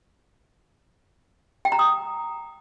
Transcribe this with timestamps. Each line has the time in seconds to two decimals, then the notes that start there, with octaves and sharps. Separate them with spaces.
1.65 G5
1.72 A#5
1.79 D#6